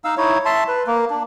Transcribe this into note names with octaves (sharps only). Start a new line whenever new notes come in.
D#4 F5 E6
D#4 E4 C#5
E5 A5 C6
B4
A#3
D4